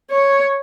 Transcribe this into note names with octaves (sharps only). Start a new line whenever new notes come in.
C#5